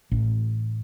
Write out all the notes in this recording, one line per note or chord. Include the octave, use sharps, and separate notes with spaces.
A1